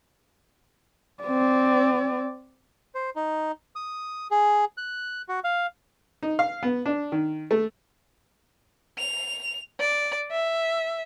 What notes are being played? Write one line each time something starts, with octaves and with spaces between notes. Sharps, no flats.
C4 D5
C5
D#4
D#6
G#4
F#6
F#4
F5
D#4
F5
B3
D4
D#3
A3
F7
D5
E5